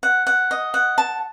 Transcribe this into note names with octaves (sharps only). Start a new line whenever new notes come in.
F#5
F#5
D#5
F#5
A5